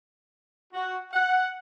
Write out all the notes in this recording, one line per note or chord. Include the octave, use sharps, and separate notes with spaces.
F#4
F#5